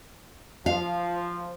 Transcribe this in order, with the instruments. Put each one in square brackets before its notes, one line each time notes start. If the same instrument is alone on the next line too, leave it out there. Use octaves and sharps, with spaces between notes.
[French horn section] F3 [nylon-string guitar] F5